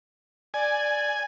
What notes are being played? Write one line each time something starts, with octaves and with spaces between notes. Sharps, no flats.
D5 G#5